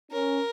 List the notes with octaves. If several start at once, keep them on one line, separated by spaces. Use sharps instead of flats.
C#4 A#4